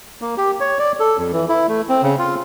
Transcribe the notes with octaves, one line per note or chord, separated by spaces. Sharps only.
A#3
G4
C#5
D5
A4
F2
E3
E4
A3
C4
C#3
F4